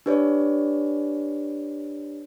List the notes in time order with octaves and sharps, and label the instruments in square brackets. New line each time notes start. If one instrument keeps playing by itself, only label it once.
[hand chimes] D4 G4 B4 C#5 D5